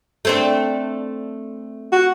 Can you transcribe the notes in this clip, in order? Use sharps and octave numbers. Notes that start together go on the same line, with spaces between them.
A3 C4 D4
F#4